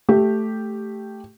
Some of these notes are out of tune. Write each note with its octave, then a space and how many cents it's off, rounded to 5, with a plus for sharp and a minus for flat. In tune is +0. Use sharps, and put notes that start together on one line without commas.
A3 +0 G4 +0